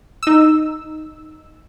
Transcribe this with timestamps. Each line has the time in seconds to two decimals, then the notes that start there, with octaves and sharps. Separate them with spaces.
0.23 D#4 E6